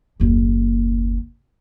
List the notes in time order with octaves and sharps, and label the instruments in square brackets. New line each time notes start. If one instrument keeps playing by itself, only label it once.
[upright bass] F#1 D#2